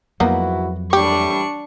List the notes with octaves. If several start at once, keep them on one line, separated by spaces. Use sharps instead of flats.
F2 G#2 F#3 A#3 B3 D#4 E4 F#4
A2 E3 G3 D4 G4 C#6